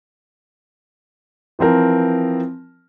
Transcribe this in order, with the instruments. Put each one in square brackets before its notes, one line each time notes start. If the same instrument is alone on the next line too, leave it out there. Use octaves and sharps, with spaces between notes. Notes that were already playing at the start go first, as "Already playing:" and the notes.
[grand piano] E3 F3 C4 A#4